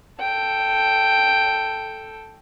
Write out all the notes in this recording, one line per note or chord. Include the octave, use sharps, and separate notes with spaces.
A4 G5